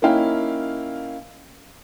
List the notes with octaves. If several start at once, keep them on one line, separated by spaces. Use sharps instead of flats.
A#3 C#4 D#4 E4 F5 G5